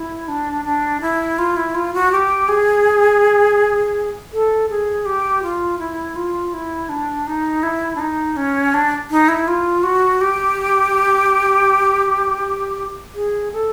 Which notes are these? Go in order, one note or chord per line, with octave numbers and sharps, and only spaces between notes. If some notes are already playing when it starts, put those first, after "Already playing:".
Already playing: E4
D4
D4
E4
F4
E4
F4
F#4
G4
G#4
A4
G#4
G4
F4
E4
F4
E4
D4
D#4
E4
D4
D#4
C#4
D4
D#4
E4
F4
F#4
G4
G#4
A4